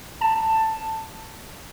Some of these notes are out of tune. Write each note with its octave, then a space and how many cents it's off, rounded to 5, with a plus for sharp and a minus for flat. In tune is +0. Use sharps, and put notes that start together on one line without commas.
A5 +15